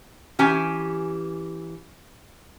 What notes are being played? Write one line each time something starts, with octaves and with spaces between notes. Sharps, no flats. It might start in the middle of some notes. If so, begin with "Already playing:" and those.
E3 C#4 G4 G#5